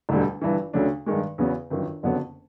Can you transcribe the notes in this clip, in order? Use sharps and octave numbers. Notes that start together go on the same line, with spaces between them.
E1 D2 D3 G3
G1 G2 E3
D2 C#3 F#3 A3 D4
G2 D#3 G#3
E2 C#3 F#3 B3
G1 F#2 D#3
F#1 F2 D3 F#3 B3